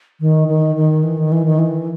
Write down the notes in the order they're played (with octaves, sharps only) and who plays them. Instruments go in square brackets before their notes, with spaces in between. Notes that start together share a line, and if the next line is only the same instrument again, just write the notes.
[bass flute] D#3
D#3
D#3
E3
D#3
E3
D#3
E3